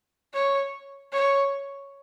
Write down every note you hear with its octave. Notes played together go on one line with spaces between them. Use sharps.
C#5
C#5